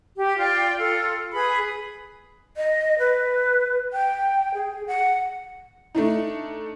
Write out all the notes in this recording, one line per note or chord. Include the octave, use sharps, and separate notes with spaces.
G4
F4 D5 G5
F4 A4
G#4 B4 B5
D#5
B4
G5
G#4
F#5
A3 D4 D#4